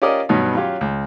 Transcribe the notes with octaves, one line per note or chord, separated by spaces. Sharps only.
C#4 F4 G4 A#4 D5 D#5
G2 B2 F#3 B3 D#4
F#3 C#4 F4 G4
C#2